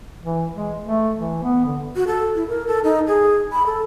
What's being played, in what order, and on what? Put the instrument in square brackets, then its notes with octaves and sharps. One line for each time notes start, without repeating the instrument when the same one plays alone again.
[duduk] E3
G#3
A3
E3
B3
D3
[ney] F#4
A4
E4
A#4
A4
D#4
G#4
B5
A4